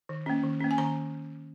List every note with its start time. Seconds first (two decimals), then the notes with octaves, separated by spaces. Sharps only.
0.09 D#3
0.26 A#3 C#4
0.44 D#3
0.60 A#3 C#4
0.71 G#5
0.78 D#3 A#5